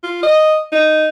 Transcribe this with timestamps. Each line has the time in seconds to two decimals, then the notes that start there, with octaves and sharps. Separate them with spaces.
0.04 F4
0.23 D#5
0.72 D#4